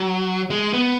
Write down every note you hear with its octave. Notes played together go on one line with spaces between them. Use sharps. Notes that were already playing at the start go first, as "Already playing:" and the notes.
Already playing: F#3
G#3
B3